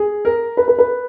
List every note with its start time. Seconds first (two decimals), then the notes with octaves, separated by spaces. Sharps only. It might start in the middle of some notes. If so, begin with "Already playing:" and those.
Already playing: G#4
0.25 A#4
0.57 B4
0.68 B4
0.78 B4